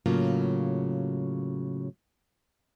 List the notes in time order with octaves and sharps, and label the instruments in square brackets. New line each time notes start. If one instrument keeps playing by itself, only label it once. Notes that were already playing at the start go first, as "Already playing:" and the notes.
[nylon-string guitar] A2 C#3 F#3 A#3 F4